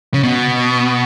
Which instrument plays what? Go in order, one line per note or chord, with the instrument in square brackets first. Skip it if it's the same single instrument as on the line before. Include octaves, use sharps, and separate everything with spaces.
[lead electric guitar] C#3
B2